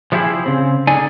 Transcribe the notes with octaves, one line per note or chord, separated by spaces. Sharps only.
F3 G#3 A3 E4 G4 G#4
C#3 C4
D3 D#4 G#4 D5 G#5